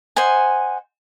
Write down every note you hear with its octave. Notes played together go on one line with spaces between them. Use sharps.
C5 D#5 F#5 G#5